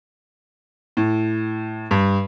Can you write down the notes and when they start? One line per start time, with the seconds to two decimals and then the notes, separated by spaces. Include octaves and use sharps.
0.97 A2
1.91 G2